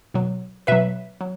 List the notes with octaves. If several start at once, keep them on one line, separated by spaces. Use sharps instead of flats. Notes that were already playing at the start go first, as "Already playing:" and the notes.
B2 F#3
B2 F#3 B4 E5
F#3